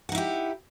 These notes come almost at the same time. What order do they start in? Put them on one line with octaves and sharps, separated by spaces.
F#5 D#4 E4 G4